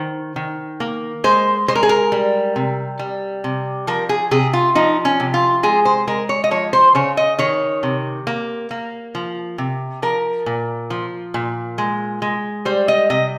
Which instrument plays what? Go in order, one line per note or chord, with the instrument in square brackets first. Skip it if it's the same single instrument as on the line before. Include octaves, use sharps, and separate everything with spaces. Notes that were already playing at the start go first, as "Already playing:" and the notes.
Already playing: [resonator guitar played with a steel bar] D#3 C5
D#3
A#3
G#3 C5
G#3 C5
A#4
G#4
A#4
G3
C3
G3
C3
F3 A#4
G#4
C3 G#4
F4
F3 D#4
C#4
C3
F4
G#3 G#4
C5
G#3 A#4
C#5
D#5
F3 C#5
C5
C#3 C#5
D#5
D#3 C#5
C3
A#3
A#3
F3
C3
F3 A#4
A#2
F3
A#2
G#3
G#3
G3 C5
D#5
C3 D#5